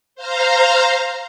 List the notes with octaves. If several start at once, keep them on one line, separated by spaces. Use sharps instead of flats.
C5 F5 A#5